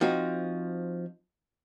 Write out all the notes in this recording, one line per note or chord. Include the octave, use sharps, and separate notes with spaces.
F3 C4 D#4 F#4